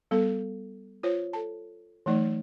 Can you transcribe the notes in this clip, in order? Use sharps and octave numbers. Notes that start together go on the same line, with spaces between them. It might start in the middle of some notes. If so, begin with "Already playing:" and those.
G3 B3 A4
F4 C5 C#5
A4 A5
E3 F#3 A3 D#4 D5